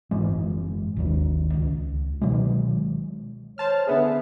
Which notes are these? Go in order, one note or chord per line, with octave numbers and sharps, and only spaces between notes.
F#1 G#2 E3 G#3
G#1 D#2 D#3
C#2
B2 D#3 F#3 G#3
C5 C#5 A5 F6
D3 B3 G#4 E5